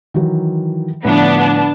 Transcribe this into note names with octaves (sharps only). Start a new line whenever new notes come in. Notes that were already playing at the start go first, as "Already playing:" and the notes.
D#3 E3 F#3
A2 D3 F3 B3 D4 A5